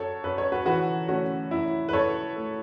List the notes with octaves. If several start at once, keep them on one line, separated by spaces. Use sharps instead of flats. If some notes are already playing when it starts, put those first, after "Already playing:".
Already playing: F#2 A4 C#5
F#2 B4
C#5
F#4 B4
E3 F#4 B4
A3 C#4 F#4
F#2 E4
B4
F#2 A4 C#5
A3